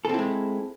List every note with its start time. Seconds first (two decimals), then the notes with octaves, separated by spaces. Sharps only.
0.05 A4
0.09 C4
0.14 E4
0.19 G#3